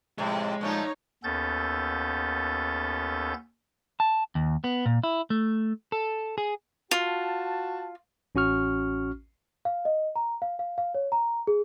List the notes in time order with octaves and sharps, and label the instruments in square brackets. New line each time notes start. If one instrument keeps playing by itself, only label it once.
[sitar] F2 A2 C3 [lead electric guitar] G#3
[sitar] A#2 F3 A3 [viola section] D#4 C#5
[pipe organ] D#2 B3 C#4 A4 G6 A6
[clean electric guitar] A5
D#2
B3
A#2
E4
A3
A4
G#4
[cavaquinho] F4 [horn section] F#4 A5
[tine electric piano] A1 C#4 F#4 C#6 F6
[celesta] F5
D#5
A#5
F5
F5
F5
C#5
A#5
G#4